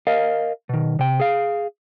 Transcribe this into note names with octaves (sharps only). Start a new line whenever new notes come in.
A#4 D#5 F5
B2 D#3
C3 G5
G#4 F5